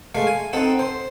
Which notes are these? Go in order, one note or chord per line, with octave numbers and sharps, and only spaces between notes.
G#3 A3 F5
G#5
C4 D#4 A4 F#5
C5